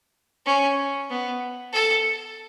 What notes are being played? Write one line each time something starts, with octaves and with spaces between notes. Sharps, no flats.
C#4
B3
A4